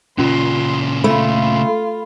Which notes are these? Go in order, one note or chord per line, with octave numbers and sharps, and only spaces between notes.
A#2 C#3 C#4 F4 C6
A3 F4 B5